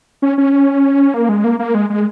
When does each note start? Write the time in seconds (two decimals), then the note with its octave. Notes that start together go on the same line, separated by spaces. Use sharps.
0.22 C#4
0.38 C#4
1.14 A#3
1.29 G#3
1.44 A#3
1.59 A#3
1.75 G#3
1.90 G#3